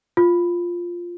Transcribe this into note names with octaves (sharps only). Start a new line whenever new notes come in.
F4